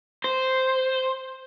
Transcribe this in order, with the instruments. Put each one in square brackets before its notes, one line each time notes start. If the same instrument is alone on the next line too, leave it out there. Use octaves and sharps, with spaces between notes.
[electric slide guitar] C5